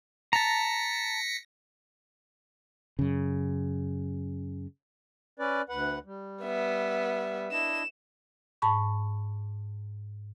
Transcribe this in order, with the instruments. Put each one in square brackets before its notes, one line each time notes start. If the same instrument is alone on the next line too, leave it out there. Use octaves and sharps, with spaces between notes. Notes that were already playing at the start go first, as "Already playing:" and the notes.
[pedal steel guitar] A5 A#5 [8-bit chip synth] A#6 B6 C#7
[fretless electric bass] F#2 C#3
[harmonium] C#4 B4 D5
D2 B4 F#5
G3
[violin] B3 E5
[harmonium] D4 E4 D#5 [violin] E7
[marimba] G#2 A5 B5 C#6